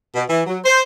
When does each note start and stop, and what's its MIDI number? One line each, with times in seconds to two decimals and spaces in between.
0.15 0.24 47
0.29 0.42 52
0.47 0.59 54
0.65 0.81 72